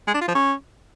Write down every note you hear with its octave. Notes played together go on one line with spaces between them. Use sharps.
G#3
D4
F4
F3
C#4